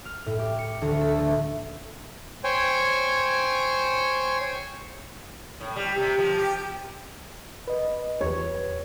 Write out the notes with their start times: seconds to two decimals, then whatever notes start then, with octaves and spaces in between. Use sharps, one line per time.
0.05 F6
0.26 A2
0.39 G4
0.59 C#7
0.82 D2
1.01 A4
1.19 A3
2.44 C5 C#5 G5 G#5
5.60 A2
5.76 G3
5.97 C3
6.19 F3
6.38 G4
7.68 B4 D#5
8.21 E2 G4 B4 C#5